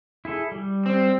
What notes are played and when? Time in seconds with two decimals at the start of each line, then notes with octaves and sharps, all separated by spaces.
0.25 E4 G#4 A4
0.52 G3
0.86 C4